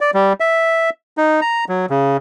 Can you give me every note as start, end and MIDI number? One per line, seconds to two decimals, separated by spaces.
0.01 0.11 74
0.14 0.33 55
0.40 0.90 76
1.18 1.40 63
1.41 1.65 82
1.69 1.86 54
1.90 2.17 49